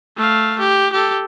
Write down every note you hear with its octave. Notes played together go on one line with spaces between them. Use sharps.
A3 F5
G4
G4 A4